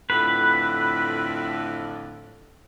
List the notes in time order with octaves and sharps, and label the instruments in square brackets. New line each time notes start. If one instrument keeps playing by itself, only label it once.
[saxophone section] F2 A2 D3 [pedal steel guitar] B4